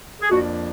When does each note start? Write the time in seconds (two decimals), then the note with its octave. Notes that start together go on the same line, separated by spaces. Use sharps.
0.21 G#4
0.31 F2 F3 A#3 D4 F#4